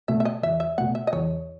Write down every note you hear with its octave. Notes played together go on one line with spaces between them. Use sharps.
B2 A3 E5
E5
D#5
E2 E5
E5
B2 A3 F#5
E5
D#5
E2 C#5